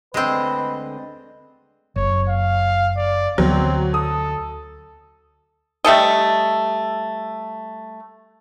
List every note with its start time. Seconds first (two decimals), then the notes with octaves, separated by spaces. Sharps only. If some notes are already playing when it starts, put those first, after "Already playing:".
0.14 D2 D3 G#3 C4 B4 D#5
1.96 F#1 C#5
2.28 F5
2.97 D5
3.38 D2 F#3 B3 C4
3.94 A4 D#6
5.84 G3 A3 A4 D#5